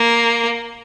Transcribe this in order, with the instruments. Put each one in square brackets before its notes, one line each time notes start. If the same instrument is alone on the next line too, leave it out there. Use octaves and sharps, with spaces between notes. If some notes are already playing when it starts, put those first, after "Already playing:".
Already playing: [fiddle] A#3